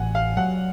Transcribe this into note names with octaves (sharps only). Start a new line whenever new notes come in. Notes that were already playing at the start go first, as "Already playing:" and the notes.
Already playing: A1 F#5 G#5
F5
F#3 F#5